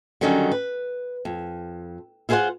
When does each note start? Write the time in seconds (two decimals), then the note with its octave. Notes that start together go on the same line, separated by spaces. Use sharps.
0.21 D3 D#3 F#3 G3 C#4 D#4
0.51 B4
1.25 F2
2.29 E4 F4 G#4 A4 C5 F#5